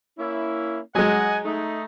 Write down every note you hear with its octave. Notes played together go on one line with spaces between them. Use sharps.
A#3 C#4 E4
F#3 G#3 D#5 F#5 G#5
A3 D#4